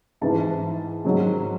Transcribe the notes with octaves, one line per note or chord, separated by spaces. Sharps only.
G#2 E3 A5
G#2 D#3 F#3